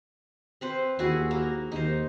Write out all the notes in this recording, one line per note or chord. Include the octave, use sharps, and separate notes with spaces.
C4 B4 C5
D#2 E4 F#4 G#4
A#3
D#2 D#4 C5